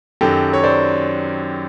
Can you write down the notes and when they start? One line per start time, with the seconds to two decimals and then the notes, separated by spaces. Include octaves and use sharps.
0.21 F#2 D#3 F#3 G4 A4
0.53 C#5
0.63 C5 D5